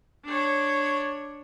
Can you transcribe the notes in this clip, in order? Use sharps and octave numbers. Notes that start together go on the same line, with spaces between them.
D4 C#5